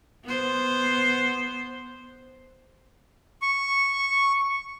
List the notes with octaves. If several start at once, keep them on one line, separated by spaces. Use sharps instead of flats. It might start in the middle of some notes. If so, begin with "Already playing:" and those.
B3 C5
C#6